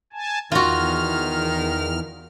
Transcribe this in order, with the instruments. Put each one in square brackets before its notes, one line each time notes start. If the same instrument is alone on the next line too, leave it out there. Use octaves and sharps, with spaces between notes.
[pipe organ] G#5 A5
[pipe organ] E2 F6 [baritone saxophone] D#3 [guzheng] F4 F#4